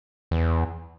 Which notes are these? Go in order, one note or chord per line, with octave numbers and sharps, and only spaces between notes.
E2